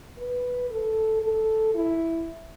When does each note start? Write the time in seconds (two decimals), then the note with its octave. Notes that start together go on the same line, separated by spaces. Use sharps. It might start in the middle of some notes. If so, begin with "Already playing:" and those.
0.18 B4
0.70 A4
1.22 A4
1.75 E4